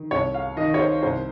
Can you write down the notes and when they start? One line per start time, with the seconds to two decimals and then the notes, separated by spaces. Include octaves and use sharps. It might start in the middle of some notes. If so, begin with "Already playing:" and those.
Already playing: D#3
0.11 C2 C#5
0.34 F5
0.57 D#3 D#5
0.74 C#5
0.80 C5
1.03 C2 C5